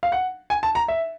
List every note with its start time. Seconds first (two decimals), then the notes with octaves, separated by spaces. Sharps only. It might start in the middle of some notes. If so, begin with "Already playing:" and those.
0.03 F5
0.12 F#5
0.50 G#5
0.63 A5
0.75 A#5
0.88 E5